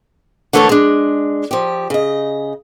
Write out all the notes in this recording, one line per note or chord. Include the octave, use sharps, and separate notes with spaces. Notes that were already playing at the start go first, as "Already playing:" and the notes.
D3 E3 A3 A4 A#4 C#5
G#3 D4
F3 G4
C#3 D#5